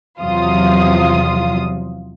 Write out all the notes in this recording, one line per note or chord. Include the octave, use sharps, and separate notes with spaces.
E2 C3 F3 F#3 F4 D#6